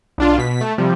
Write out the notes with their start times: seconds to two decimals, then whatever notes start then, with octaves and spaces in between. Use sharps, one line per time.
0.18 B1 D4 F4
0.38 B2 B6
0.61 A3
0.78 C3 F3 G3